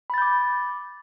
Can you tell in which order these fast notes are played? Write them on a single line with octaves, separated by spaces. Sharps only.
B5 A6 G6 D6